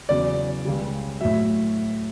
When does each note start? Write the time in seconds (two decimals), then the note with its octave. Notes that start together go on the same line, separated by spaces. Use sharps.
0.09 E2 C#3 F#3 D5
0.65 C#2 C#3 G3
1.21 A2 F#3 E5